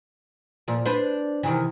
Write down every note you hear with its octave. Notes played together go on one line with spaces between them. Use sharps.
A#2 F3
D4 B4 C5
C3 D#3 E3